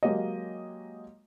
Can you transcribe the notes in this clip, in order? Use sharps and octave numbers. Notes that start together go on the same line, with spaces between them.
F#3 G#3 A#3 G4 C#5 D#5